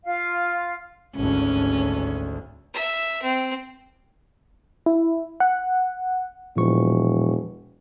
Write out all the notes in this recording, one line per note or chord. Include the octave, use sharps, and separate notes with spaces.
F4 F5
G#1 D2 C#4
E5
C4
E4
F#5
E1 A#2 F3 C#6